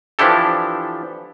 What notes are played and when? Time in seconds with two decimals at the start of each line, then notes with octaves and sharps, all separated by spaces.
0.19 E3 F3 D4 E4 G4 A4